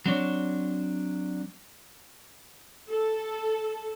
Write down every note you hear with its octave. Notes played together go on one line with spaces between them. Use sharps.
F#3 C4 D4 C#5
A4